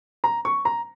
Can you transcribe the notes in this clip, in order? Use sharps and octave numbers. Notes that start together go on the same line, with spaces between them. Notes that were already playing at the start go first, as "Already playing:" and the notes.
A#5
C#6
A#5